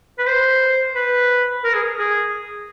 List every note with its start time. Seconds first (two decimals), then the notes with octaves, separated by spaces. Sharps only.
0.18 B4
0.26 C5
0.95 B4
1.64 A#4
1.73 G#4
1.99 G#4